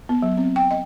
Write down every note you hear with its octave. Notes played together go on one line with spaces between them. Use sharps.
B3
F#3
C4
G5
D#5